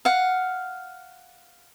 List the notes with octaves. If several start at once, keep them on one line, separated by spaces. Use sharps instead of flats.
F5 F#5